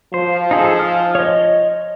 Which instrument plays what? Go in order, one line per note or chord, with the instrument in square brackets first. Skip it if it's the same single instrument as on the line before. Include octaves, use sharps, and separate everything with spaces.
[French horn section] F3 [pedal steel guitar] C5
[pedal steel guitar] D#4 G#4 A4
F6
C#5 D#5